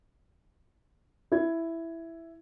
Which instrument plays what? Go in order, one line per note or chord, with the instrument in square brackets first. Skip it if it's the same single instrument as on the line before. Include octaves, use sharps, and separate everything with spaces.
[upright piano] E4 G#6